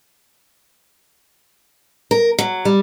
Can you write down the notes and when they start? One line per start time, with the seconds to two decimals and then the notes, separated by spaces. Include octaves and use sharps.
2.11 A#4
2.39 F#3
2.65 G3